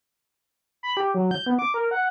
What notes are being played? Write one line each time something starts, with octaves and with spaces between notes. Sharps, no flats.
B5
G4
F#3
G6
B3
D6
A#4
F#5